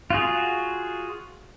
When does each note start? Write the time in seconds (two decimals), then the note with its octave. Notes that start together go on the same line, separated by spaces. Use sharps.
0.10 F4 F#4 G#4